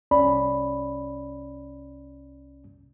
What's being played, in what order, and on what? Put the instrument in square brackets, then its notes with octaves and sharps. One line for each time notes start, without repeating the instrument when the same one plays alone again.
[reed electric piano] C2 C#4 D5 B5